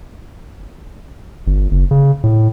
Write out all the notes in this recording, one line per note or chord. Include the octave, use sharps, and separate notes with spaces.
G1
F#1
C#3
A2